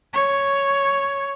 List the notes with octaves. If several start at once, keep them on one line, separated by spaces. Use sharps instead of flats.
C#5